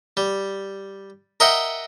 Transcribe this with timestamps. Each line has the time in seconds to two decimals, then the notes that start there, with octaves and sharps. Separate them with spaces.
0.17 G3
1.40 A#4 D#5 E5 F#5 G5